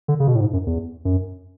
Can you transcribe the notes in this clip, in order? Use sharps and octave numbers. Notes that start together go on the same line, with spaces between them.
D3
C#3
B2
A2
G#2
F#2
E2
F#2